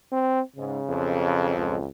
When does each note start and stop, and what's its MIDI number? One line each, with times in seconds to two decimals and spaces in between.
0.12 0.41 60
0.56 0.79 44
0.56 1.55 49
0.90 1.76 35
0.90 1.76 41
1.56 1.88 37